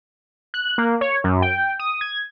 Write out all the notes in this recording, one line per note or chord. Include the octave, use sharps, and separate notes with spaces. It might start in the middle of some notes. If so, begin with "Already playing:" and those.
F#6
A#3
C#5
F#2
G5
D#6
G#6